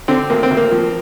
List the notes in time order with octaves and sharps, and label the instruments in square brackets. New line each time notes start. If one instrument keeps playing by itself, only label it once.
[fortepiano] D3 C4
D2 A#3
C4
D2
A#3
F3